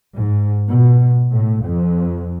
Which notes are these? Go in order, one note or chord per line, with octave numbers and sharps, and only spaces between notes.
G#2
B2
A2
F2